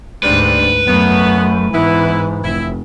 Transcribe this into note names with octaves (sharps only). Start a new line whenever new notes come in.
D2 G#2 G3 C4 D4 B4
F#2 A3 B3
G#2 E3 B3 E4
F1 E4 E5